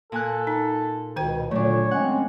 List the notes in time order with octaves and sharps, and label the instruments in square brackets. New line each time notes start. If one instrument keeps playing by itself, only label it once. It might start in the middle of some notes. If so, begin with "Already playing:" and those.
[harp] A#2 G#5 F#6 [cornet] A4
[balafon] D#4
[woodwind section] C#2 B2 [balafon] D#3 C5 G5
[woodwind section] A#2 D3 [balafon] F#3 [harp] A3 D4 [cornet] C#5
[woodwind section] G#3 C4 C#4 [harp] F#5